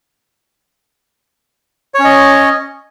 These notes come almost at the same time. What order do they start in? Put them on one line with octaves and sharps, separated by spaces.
C#5 C#4 D#5